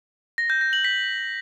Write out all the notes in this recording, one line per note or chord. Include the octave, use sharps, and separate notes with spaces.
A#6
G6
A#6
F#7
B6